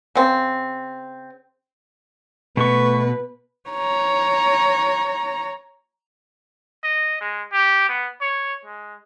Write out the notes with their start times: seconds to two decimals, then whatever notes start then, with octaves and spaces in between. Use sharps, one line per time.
0.15 C#3 C4
2.57 B2 A3 B4 C#6
3.70 C#5 A#5
6.83 D#5
7.21 G#3
7.53 G4
7.89 B3
8.21 C#5
8.65 G#3